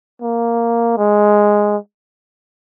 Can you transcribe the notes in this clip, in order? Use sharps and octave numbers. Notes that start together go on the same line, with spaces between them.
A#3
G#3